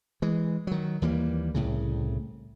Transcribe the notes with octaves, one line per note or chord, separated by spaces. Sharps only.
E3 G#3
D#3 F#3
D#2 E3 G3 A#3
C2 A2 C#3